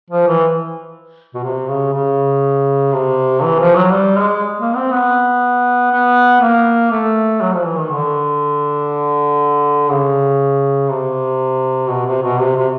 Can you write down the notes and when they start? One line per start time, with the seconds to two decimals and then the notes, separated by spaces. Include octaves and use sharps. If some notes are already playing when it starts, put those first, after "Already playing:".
0.10 F3
0.27 E3
1.34 B2
1.43 C3
1.69 C#3
1.93 C#3
2.92 C3
3.42 E3
3.59 F3
3.76 F#3
3.92 G3
4.17 G#3
4.59 A#3
4.76 C4
4.92 B3
5.92 B3
6.41 A#3
6.91 A3
7.41 F#3
7.53 F3
7.66 E3
7.78 D#3
7.91 D3
9.90 C#3
10.90 C3
11.89 B2
12.06 C3
12.22 B2
12.39 C3
12.56 C3